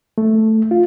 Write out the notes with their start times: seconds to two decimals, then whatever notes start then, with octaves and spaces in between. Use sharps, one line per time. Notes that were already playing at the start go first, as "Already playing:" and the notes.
0.18 A3
0.71 F4